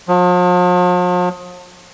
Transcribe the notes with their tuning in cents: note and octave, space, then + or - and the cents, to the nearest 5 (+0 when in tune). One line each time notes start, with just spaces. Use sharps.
F3 +45